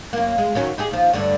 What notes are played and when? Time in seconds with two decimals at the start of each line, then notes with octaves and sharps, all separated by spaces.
0.13 F#2 A#3
0.38 G#3
0.55 D#3 F#3 C#4
0.78 D#4 G4 G#4
0.91 D#2 F3
1.13 D2 G2 D3